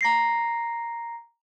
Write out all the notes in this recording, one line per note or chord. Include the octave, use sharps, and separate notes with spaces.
A#5 A#6 C7